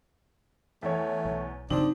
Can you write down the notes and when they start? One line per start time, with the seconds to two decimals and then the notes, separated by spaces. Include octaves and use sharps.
0.82 E2 A3 C#5
1.25 B1
1.70 G1 C#3 F#3 C4 D4 D#4